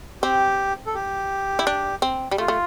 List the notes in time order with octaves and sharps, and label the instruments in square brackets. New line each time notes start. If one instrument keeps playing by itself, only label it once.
[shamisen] C4 [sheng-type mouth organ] G4
[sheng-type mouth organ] A4
G4
[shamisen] E4
D4
C4
G3
[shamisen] A3 [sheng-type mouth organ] F4
[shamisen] A3